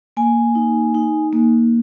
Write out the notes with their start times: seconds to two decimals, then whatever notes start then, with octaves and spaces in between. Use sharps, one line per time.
0.17 A#3 G#5
0.55 D#4
0.95 D#4
1.33 A#3